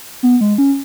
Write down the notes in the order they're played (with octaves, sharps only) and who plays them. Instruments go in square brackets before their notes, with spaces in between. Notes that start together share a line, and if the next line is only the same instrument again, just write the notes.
[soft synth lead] B3
G#3
C#4